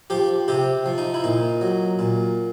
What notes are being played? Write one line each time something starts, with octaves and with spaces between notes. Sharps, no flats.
F3 G4
C3 G4
F3
D#4
E4
A#2 D#4
F#3
A#2